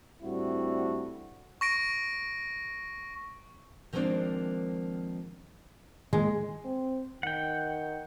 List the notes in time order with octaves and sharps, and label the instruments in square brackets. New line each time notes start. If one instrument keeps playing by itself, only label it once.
[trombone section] A2 G3 C4 D4 E4 F#4
[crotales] C#6 A#6 D7
[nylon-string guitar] D#3 F3 G#3 A#3 C4 D4
[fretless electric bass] D#3 E3 A#3 [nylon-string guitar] G#3
[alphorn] C4
[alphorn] D#3 [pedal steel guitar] F#5 G5